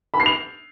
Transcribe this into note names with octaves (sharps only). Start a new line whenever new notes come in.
B5
C7
F7